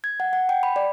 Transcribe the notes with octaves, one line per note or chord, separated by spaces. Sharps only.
G#6
F#5
F#5
G5
B5
D5